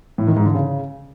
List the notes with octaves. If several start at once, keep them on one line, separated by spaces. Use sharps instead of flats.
A2
D#3
G#2
D3
C#3